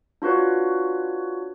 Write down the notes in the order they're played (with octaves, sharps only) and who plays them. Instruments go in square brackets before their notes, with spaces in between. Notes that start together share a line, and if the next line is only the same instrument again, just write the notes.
[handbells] D4 F4 F#4 B4 C#5